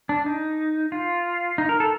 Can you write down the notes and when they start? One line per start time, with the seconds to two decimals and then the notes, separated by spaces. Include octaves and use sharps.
0.09 D4
0.26 D#4
0.92 F4
1.58 D#4
1.69 A#4
1.80 A4